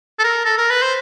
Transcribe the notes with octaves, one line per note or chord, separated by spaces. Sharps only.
A4
A#4
A4
A#4
B4
C5